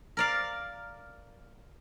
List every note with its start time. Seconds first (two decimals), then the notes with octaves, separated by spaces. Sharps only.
0.17 A#4 D5 F5